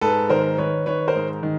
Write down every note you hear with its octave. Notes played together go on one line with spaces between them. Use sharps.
G#2 A4 B4
D#3 A#4 C5
D#3 B4 C#5
D#3 B4 C#5
A#4 C5
G#2
D#3